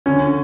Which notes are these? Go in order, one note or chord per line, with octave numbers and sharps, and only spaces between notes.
D3 C#4